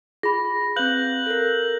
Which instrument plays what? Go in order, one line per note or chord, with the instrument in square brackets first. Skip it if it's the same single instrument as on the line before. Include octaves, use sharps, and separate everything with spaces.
[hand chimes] F4 [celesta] G#4 B5 [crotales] A#6
[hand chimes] C4 B4 [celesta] F5 [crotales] F#6 G6 F#7
[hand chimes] A4 A#4